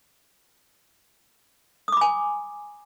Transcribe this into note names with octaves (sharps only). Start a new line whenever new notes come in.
G#5 B5 D6 D#6